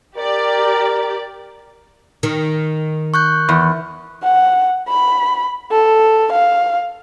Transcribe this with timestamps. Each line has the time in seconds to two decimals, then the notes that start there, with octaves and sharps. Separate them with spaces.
0.17 G4 A#4 D5
2.23 D#3
3.14 C#6 F#6 G6
3.49 E2
4.23 F#5
4.88 B5
5.72 A4
6.32 F5